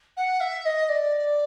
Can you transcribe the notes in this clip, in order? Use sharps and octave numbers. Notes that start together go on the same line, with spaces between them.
F#5
E5
D#5
D5